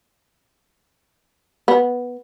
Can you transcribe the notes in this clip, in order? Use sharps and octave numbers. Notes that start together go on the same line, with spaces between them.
B3